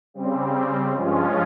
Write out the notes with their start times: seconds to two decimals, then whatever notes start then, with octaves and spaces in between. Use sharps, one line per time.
0.14 C#3 G3 C4
0.93 G2 F3 G#3 C#4 F4